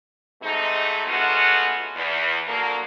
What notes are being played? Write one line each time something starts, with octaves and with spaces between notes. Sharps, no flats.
G#2 C3 G#3 A3 D#4
G#3 A3 B3 C#4 F4 F#4
E2
D3 F3 F#3 A#3